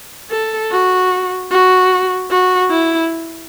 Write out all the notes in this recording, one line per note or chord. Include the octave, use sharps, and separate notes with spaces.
A4
F#4
F#4
F#4
E4